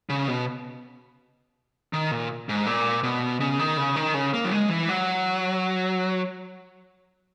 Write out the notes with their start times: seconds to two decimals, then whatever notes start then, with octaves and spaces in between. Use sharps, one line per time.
0.09 C#3
0.28 B2
1.93 D#3
2.11 A#2
2.49 G#2
2.66 A#2
3.03 B2
3.40 C#3
3.59 D#3
3.77 C#3
3.96 D#3
4.14 C#3
4.34 A#3
4.45 F#3
4.52 G#3
4.69 E3
4.89 F#3